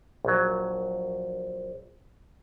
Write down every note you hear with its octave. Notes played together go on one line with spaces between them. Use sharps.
A#1 F#3